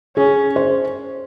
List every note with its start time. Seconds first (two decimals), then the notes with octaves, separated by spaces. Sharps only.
0.16 C#4 G#4
0.56 C5